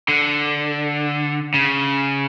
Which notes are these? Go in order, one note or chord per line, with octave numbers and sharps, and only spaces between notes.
D3
C#3